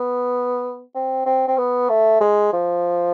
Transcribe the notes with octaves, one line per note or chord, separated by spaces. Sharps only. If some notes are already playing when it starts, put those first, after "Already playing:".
Already playing: B3
C4
C4
C4
B3
A3
G#3
F3